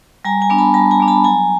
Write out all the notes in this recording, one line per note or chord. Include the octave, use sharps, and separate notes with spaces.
G3 G#5 A#5
G#5 A#5
B3 D4
A5 B5
G3 A5 B5
G#5 A#5
B3 D4
A5 B5
F#3 G#5 A#5